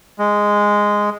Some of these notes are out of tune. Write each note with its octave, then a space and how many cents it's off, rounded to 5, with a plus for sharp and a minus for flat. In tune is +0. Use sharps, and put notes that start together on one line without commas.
G#3 -5